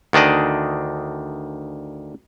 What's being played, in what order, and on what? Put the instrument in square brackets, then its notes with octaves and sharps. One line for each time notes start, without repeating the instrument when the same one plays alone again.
[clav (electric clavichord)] D2 D#3 D4 D5 D#5